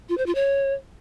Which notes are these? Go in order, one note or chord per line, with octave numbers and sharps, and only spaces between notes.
F4
C5
F4
C#5